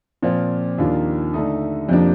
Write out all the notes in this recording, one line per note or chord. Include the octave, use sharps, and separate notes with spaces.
A#2 F3 C4 F4
D#2 D#3 A#3 D4 F4
D3 A3 D#4
F2 C3 F3 A#3 D4